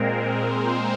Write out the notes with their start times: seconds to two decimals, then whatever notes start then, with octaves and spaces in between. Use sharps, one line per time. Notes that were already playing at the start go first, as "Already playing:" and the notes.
Already playing: A#2 G#3 C4 A#4
0.64 C5